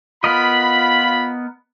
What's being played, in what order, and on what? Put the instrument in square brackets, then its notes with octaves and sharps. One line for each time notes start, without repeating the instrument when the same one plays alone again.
[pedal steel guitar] B3 A#4 D#5 [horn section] F4 B5